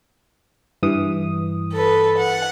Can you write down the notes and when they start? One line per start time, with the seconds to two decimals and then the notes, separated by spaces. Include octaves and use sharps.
0.83 G2 E3 D#6
1.74 A4 B4
2.17 F#5